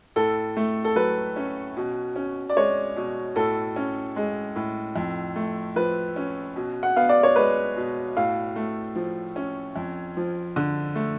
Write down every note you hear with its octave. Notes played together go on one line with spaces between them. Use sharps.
A2 A4
A3
A4
F#3 B4
C#4
B2
C#4
D5
G#3 C#5
B2
A2 A4
C#4
G#3
A2
F2
A3
F3 B4
C#4
B2
F#5
B3 F5
D5
C#5
G#3 B4
B2
A2 F5
A3
F3
C#4
F2
F3
D3
A3